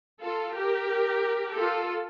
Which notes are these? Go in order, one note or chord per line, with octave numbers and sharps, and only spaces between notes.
F4 A4
G4 A#4
F4 A4